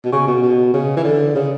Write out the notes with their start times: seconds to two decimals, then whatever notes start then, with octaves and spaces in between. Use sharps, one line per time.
0.05 B2
0.12 C#3
0.28 B2
0.43 B2
0.73 C#3
0.97 E3
1.04 D3
1.35 C#3